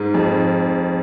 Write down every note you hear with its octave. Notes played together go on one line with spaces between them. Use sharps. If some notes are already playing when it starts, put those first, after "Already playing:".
Already playing: G#2
F2